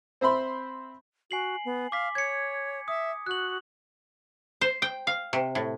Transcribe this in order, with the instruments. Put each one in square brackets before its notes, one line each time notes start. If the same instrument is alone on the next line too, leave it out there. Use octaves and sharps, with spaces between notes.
[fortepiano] C4 C5 E5 B5 C6
[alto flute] F#4 [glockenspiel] G#5 C7 F#7
[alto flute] B3
[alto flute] F5 [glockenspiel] D6 B6
[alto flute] C#5 [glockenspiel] G#6 C#7
[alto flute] E5 [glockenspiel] D#6
[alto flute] F#4 [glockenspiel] F#6 F#7
[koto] C5
G5
F5
C3
A2